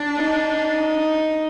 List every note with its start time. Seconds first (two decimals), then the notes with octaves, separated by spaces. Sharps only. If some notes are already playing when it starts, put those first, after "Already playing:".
Already playing: D4
0.17 D#4